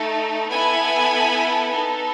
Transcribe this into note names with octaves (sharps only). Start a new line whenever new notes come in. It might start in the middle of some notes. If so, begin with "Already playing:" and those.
Already playing: A3 D#4 A4
B3 E4 A4 G#5 B5
B3 D#4 A4